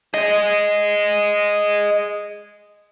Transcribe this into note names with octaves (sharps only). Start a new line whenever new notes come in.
G#4 D#5